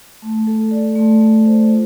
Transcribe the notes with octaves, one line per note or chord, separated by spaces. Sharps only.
A3
A4
D5
A3
A4
C5
F4